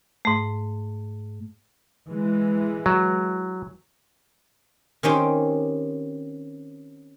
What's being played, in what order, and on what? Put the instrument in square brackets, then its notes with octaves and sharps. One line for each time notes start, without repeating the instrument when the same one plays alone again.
[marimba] G#2 A3
[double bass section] E3 G#3
[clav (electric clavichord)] F#3
[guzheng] D#3 C4 C#4 G4